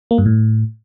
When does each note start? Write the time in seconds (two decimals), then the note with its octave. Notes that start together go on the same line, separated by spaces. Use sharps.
0.11 A#3
0.18 G2
0.26 A2